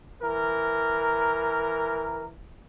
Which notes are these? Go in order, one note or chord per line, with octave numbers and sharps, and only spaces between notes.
E3 A#4